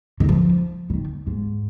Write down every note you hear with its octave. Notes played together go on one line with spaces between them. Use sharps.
D#3
F3
C#3
D#3
G#2